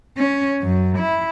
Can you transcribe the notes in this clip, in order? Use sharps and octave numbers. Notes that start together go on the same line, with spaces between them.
C#4
F#2
E4